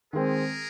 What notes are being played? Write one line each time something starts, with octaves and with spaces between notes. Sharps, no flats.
D#3 G#3 C4 G#4 A#4